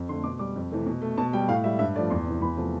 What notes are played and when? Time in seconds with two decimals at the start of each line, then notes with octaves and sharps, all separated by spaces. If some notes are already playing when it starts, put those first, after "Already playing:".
Already playing: F2
0.09 D3 C6
0.12 A3
0.24 B2 D6
0.39 G3 D6
0.56 F2
0.71 C3 E3 A3
0.86 B2
1.02 A3
1.18 B2 A5
1.33 G3 G5
1.48 A2 F5
1.64 G3 E5
1.79 G2 E5
1.95 A3 D5
1.98 F3
2.10 E2 C6
2.27 C3 E3
2.41 E2 B5
2.57 C3 F3 A3